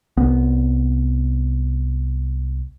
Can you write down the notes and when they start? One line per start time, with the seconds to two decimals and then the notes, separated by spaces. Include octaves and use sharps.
0.17 C2 B3